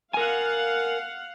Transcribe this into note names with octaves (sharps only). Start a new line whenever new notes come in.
A#4 F5 F#5 G#5